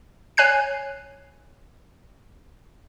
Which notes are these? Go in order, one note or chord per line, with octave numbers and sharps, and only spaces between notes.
C#5 G#5 F#6 C7